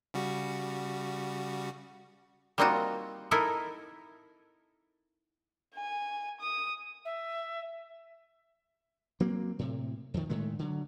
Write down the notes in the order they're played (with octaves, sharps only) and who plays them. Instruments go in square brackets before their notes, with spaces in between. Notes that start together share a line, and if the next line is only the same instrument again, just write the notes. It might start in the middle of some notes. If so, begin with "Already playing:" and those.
[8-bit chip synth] C#3 G3 F#4
[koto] G3 A#3 C4 D#4 F4 F#4
D#4 E4 A4 A#4 D#5
[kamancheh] G#5
D#6
[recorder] E5
[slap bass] F#3 A#3 C4
A2 C3
F2 D#3
A2 D#3 G#3 A3
D3 F#3